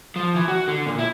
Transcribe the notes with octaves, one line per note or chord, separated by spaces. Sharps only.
F3
E3
F#4
D3
A#2
E4